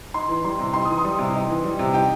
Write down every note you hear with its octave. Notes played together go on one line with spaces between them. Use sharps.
D#4 C6
E3
G3 C6
C3
D#4 C6
E3 D#6
C6
G3
C3
D#4
E3
G3
C3
D#4 G5